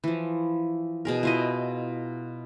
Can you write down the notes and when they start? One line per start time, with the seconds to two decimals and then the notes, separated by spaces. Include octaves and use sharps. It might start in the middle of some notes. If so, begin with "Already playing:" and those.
0.04 E3 F3
1.05 B2 G#4 A#4
1.23 E4 F4 D#5